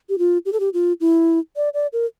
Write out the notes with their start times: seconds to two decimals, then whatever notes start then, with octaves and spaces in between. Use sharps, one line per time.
0.09 G4
0.19 F4
0.46 G4
0.53 A4
0.60 G4
0.74 F4
1.01 E4
1.56 D5
1.74 D5
1.93 A#4